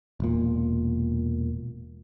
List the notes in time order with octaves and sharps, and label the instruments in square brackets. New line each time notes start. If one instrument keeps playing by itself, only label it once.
[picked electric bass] E1 A#2